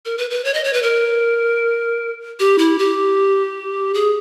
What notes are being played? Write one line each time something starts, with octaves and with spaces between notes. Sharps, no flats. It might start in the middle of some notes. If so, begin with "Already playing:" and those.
A#4
B4
B4
C#5
D#5
C#5
B4
A#4
G4
E4
G4
G#4